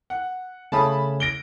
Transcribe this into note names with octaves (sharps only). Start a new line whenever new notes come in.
F#5
C#3 A3 C#4 A5 B5 D#6
A#6 D7 G7